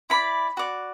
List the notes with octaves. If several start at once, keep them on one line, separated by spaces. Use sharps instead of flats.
E4 D5 B5
F#4 D5